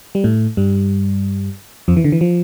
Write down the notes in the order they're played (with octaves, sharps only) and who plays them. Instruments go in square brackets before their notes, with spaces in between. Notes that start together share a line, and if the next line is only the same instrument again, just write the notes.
[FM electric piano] G3
A2 A3
G2 G3
F2 F3
E3
D3
E3
F3